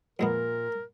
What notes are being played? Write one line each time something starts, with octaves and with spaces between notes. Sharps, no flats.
F2 A#2 G#3 B3 A#4